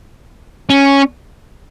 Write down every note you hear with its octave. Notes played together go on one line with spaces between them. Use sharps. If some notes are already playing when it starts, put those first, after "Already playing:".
C#4